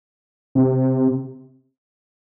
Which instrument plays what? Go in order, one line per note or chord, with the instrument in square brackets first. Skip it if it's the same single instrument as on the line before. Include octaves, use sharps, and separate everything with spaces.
[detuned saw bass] C3